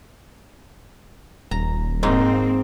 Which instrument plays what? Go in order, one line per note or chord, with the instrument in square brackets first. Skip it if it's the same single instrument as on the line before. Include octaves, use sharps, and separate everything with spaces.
[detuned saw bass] D#1 [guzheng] A#5
[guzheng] G#2 D#4 [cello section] A#3 C4